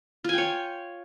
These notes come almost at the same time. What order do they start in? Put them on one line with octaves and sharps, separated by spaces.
F4 G#5 G5 C#5